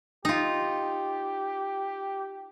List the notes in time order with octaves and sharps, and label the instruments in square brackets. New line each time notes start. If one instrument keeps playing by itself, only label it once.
[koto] D#4 F4 [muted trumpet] G4